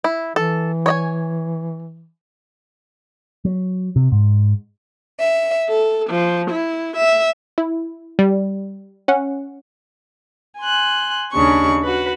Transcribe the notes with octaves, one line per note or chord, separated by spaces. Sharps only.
E4
E3 A4
C#5 D#5 G#5
F#3
C3
G#2
E5
A4
F3
E4
E5
E4
G3
C#4 F#5
G#5 C6 F#6
D#2 C#3 D4 C#6
F#4 B4